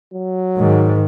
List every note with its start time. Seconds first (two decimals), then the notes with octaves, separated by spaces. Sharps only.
0.14 F#3
0.59 G#2 D#3